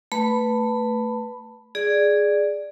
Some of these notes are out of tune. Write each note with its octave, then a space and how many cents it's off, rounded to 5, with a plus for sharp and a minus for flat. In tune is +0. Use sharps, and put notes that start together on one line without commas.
A3 +20 B4 +0 B5 +0
G#4 +0 D5 +5